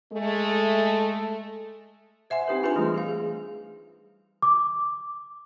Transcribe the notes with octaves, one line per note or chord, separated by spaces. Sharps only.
G#3 A3
C5 E5 F#5 G#5 C6
C4 D#4 G4 B4
D4 F4 G#4 B4 G#5 C6
E3 G3 A3
G#4 F5
G#4
D6